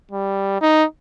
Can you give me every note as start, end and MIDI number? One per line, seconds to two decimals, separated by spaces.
0.11 0.56 55
0.61 0.84 63